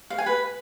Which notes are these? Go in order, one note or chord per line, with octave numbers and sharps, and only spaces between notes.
F5
G#5
B4